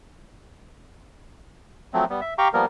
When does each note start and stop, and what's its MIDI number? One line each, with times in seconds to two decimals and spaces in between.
1.93 2.05 53
1.93 2.05 54
1.93 2.05 57
1.93 2.05 60
2.10 2.21 55
2.10 2.21 59
2.21 2.34 76
2.38 2.48 67
2.38 2.48 77
2.38 2.48 79
2.38 2.48 82
2.38 2.48 85
2.53 2.65 53
2.53 2.65 55
2.53 2.65 58
2.53 2.65 59
2.53 2.65 70